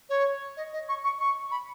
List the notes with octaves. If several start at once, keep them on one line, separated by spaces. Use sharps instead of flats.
C#5
D#5
D#5
C#6
C#6
C#6
B5